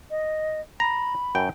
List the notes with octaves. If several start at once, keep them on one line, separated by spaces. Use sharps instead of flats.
D#5
A#5 B5
F#2 G5